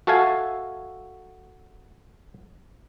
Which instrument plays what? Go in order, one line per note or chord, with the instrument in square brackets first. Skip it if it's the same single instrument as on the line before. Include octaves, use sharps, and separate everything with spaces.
[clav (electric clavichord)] F#4 A4 E5 F5 G#5